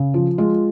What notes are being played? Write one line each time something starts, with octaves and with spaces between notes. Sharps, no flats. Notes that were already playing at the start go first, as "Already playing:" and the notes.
Already playing: C#3
F3
G#3 F4